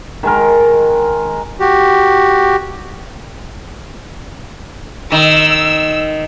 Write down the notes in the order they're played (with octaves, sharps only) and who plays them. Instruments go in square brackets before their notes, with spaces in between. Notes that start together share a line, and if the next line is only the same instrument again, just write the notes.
[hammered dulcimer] D#3 G#3 A#4
[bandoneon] F#4 G4
[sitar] D#3 [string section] E6